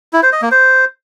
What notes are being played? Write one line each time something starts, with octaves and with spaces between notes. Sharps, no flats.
E4
C5
D#5
A#3
C5